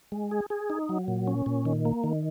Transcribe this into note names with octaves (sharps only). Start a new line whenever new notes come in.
G#3
G#4
G#4
D#4
F#3
A#2
C#4
A#2
D#3
A#3
D#3